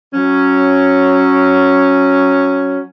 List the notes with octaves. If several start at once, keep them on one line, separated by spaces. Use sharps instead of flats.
F#3 C#4